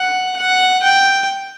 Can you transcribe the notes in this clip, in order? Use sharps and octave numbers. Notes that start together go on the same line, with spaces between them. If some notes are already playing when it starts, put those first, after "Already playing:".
Already playing: F#5
F#5
G5